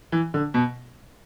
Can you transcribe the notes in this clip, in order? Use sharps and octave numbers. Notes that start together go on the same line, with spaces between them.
E3
D3
B2